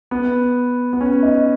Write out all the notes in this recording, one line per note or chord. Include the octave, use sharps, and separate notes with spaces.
B3
B3
C#4
D#4